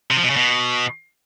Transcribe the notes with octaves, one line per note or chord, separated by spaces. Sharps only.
C3
F3
B2
C#3
B2